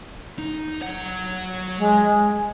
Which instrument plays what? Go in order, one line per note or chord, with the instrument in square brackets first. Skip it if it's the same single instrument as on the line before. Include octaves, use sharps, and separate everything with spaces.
[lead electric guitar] D#4
F#3 F#5
[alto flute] G#3